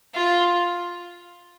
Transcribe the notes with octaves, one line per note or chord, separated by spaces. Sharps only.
F4